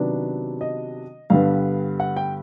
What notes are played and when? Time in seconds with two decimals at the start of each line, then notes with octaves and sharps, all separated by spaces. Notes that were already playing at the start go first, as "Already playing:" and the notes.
Already playing: C3 D#3 F#3 B3 D4 D5
0.61 D#5
1.30 G2 D3 G3 B3 F5
2.00 F#5
2.17 G5